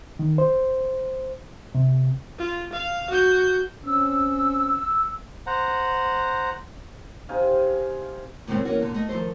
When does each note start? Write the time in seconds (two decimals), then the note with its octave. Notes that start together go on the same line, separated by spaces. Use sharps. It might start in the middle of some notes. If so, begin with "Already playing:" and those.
0.19 D#3
0.38 C5
1.75 C3
2.38 F4
2.73 F5
3.10 F#4 G6
3.84 C4 C#4 E6
5.47 C5 F#5 A#5
7.29 C3 D#4 G#4 F5
8.47 D#2 A2 C#3 G#3 A3 C4
8.65 E3 A#3 C#4 F#4
8.80 A#2 D3
8.94 A3 D#5
9.09 D#3 F3 A4 C5